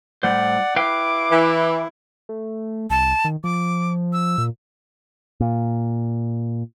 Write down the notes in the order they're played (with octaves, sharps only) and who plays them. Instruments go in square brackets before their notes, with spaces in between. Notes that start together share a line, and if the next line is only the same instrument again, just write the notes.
[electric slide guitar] A2 G3 C5 [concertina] D5 F#5
[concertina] E4 [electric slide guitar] B4 F5 G5 [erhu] D6
[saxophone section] E3
[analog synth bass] A3
[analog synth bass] C2 [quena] A5
[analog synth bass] D#3
[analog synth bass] F3 [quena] D6
[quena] E6
[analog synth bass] A#2
[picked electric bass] A#2